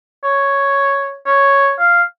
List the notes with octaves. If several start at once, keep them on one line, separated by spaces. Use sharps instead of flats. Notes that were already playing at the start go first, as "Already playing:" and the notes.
C#5
C#5
F5